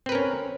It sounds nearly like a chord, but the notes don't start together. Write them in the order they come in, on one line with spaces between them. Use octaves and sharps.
C4 B4 A#4 C#4